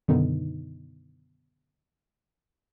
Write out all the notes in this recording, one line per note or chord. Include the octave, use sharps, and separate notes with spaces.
F#2 B2 D3 D#3 B3 D#4